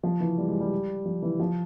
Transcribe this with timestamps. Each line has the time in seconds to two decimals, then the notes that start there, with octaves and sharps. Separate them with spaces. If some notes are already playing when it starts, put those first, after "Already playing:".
0.03 F3
0.20 E3
0.38 G3
0.48 G#3
0.60 G3
1.05 F3
1.22 E3
1.40 F3